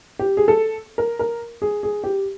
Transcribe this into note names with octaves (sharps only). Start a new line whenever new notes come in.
G4
G#4
A4
A#4
A#4
G#4
G#4
G4